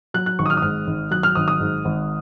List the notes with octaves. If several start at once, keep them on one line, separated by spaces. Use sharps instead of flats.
F#3 F#6
F#6
G#1 C#6
D#6
F6
D#6
G#2 F6
G#1
F#3 F#6
F6
G#1 D#6
D#6
G#2
G#1